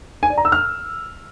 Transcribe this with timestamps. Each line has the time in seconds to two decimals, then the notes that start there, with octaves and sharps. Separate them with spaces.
0.23 G#5
0.30 D5
0.38 A#5
0.45 E6
0.52 F6